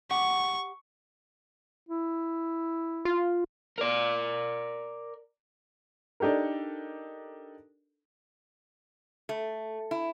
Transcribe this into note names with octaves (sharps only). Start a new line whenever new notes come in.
G4 F#5 C#6
E4
F4
A#4 D5
D4 D#4 G4 A4 A#4
A3
E4